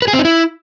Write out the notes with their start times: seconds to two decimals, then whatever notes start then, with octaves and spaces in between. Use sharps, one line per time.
0.02 B4
0.08 G#4
0.13 C4
0.19 D#4
0.25 E4